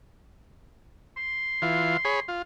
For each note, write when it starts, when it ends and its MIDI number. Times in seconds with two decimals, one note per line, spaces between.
1.17 2.34 84
1.62 1.97 52
1.62 1.97 65
2.05 2.20 68
2.05 2.20 73
2.05 2.20 83
2.28 2.42 65